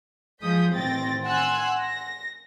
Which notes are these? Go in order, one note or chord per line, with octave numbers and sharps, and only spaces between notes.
F3 G#3 G#4 D#6 G6 B6
A1 D#3 C4 G5 A6 A#6
F#5 G#5 C6 E6 F#6 G#6
A#6